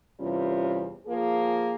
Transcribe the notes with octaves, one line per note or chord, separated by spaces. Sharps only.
E2 C3 G3 C#4 F4
F3 A#3 F4 G#4